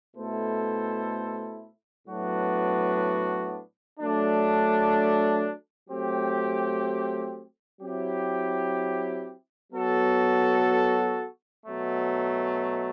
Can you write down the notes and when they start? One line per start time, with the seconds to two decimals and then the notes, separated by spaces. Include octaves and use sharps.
0.16 B2 A3 E4 A4 C5
2.08 A2 F#3 B3 D4 F#4
3.99 F#3 A3 D4
5.90 F#3 A3 C4 G4
7.81 F#3 C4 E4 G4
9.73 F#3 B3 F#4 A4
11.64 B2 F#3 A3